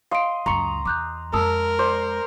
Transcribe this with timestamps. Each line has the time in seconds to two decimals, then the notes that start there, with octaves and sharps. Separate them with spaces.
0.11 D#5 F5 C6 D7
0.46 C#2 F#2 A#5 C6 C#6 C#7
0.86 E2 D6 F#6 G6
1.34 F2 G#3 A#4 A5 D#6 E6
1.79 C5 D5